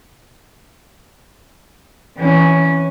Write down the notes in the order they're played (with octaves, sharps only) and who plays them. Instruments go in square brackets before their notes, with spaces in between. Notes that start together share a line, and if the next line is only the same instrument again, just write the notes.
[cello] E3 C#4